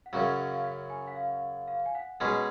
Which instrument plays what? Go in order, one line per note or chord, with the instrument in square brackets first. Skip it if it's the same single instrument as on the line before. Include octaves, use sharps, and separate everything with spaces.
[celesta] F#5
[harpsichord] F#2 C#3 F#3 [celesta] F5
[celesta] F5
F#5
G#5
F#5
F5
F5
G#5
F#5
[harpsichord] B2 G#3 C#4 G#4 [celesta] G#5